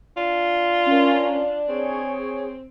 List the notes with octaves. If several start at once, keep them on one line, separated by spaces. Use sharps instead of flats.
D4 F4
C#4 A#4
C4 G#4 C#5